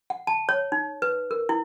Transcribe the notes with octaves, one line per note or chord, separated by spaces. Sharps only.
F#5
A5
C#5
D#4
B4
A#4
E4